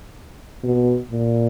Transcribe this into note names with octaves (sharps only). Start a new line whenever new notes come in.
B2
A#2